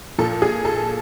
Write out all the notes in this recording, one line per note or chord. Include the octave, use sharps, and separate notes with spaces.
A#2 F3 A4
G#4
A4